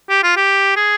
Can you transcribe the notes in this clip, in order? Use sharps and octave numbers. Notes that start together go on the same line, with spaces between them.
G4
F4
G4
G#4